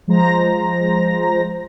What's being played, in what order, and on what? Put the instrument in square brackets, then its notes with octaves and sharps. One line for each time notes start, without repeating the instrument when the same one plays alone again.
[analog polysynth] F3 G#3 C5 A#5 A#6